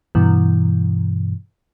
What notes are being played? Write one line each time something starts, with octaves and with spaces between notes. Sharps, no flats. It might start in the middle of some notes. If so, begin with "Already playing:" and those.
G2 B2 E3